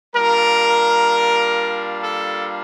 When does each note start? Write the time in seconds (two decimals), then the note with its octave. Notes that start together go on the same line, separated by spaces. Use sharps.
0.15 G3 A#3 D4 F4 A#4
2.01 A4